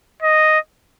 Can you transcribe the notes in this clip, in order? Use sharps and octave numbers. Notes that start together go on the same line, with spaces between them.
D#5